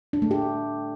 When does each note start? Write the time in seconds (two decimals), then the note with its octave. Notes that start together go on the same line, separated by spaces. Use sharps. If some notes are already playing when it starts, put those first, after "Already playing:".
0.13 D4
0.22 A3
0.31 G4